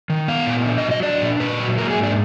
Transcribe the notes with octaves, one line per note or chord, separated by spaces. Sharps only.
D#3
B3 F5
A#2
D4
D#5
F#3
D#5
D4 D5
A#2
A#2 B4
F#3
A#3 A#4
G#4
G#2
D4